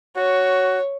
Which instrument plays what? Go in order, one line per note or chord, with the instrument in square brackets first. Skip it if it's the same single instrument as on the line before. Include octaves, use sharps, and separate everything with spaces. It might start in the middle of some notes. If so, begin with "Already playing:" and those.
[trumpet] F#4 [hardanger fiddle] C#5